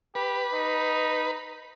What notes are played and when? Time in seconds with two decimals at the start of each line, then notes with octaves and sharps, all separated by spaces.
0.15 G4 B4
0.53 D#4